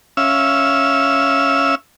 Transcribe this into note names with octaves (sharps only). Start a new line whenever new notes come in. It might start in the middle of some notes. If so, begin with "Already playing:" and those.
C#4 E5 F5 E6